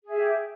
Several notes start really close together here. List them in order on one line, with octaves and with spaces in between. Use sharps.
G#4 E5 G4